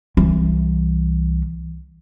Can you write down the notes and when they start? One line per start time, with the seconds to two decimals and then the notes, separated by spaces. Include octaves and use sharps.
0.17 C2 E3